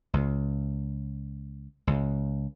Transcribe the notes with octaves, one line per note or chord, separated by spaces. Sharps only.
C#2
C#2